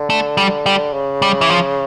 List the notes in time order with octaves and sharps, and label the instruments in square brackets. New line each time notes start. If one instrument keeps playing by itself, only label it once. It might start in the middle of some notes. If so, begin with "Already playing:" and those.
Already playing: [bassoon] D3
[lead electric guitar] A3
G3
G3
[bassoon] C#3
[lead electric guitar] G3
E3
F3